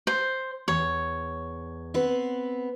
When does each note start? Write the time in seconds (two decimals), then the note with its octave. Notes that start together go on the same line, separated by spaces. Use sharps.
0.07 C5
0.68 E2 C#5
1.94 B3 C4 B4